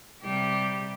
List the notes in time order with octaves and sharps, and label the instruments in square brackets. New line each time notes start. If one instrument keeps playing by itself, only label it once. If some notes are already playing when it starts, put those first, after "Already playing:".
[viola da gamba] C3 G3 G4